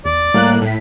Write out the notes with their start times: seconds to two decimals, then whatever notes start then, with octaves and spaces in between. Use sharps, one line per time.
0.05 E2 D5
0.34 A2 G3 A#3 F#6
0.62 A2 B6